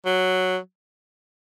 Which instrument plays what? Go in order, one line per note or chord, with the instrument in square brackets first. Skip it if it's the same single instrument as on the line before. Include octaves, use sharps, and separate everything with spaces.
[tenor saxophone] F#3